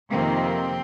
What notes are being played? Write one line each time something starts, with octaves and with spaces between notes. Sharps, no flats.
F2 C3 D#3 A#3 C4